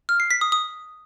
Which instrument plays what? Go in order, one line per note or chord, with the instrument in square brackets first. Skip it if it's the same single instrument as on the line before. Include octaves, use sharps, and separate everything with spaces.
[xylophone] F6
C7
B6
D#6
D#6